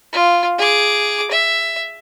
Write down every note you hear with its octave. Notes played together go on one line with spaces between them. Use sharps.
F4
G#4 D6
E5